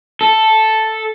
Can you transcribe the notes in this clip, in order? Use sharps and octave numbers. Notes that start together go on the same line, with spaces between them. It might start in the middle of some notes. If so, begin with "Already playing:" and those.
A4